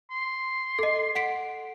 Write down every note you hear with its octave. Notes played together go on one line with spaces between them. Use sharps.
C6
A4 D#5
F#5 B6 D7